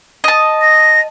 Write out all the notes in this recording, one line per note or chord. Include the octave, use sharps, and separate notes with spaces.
D#5 A5
A#6